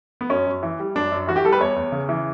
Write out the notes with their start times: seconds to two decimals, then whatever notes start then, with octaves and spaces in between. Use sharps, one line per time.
0.21 B3
0.29 F#2 C#4
0.47 F#2
0.63 E3
0.79 G3
0.95 F#2 D4
1.12 F#2
1.27 E3 F#4
1.36 G4
1.44 G3 A4
1.52 B4
1.60 E2 C#5
1.76 E2
1.92 C#3
2.09 E3